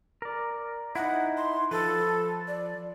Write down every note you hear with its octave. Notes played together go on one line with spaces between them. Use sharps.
A#4 D5
D#4 E4 F#5
C6
F3 A4 B4
D5